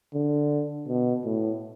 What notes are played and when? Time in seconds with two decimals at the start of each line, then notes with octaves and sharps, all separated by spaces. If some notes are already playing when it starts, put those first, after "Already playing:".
0.15 D3
0.88 B2
1.25 A2